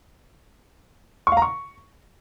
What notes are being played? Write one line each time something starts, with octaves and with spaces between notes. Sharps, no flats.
C#6
F5
A#5
C#6